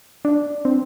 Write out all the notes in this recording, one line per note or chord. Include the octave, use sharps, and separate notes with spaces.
D4
C4